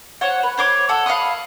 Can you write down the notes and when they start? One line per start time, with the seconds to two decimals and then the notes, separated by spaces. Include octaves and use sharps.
0.21 C5 C#5 F#5
0.43 B4
0.57 C5 C#5 D6
0.89 A4 F#5
1.06 F5 B5 C#6 D#6